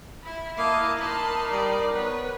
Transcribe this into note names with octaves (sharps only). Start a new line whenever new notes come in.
E4 B5
A#3 E4 A#4 D#5 F5 A5
D#4 A5 B5 C6
G3 D5
B3 B4 C#5